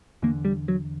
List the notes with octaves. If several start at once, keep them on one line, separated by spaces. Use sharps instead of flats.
E2 D3 A#3
G3
F#3